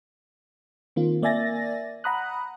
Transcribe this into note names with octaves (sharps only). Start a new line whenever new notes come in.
D#3 A#3 C4 F4
A#3 D5 E5 G#5 A6 A#6
F#5 A#5 B5 D#6 F#6